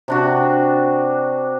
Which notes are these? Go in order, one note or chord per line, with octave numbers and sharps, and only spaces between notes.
C3 D4 F#4